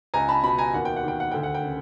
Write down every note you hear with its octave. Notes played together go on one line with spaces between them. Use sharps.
C#2 G#5 A#5
A5 B5
B2 A5 B5
G#5 A#5
D#2 F#5
G5
F#5
D#3 G5
F#5
D2 G5
F#5
G5
C#3